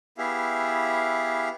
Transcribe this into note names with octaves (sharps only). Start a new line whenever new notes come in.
B3 E4 G4 G#4 E5 F5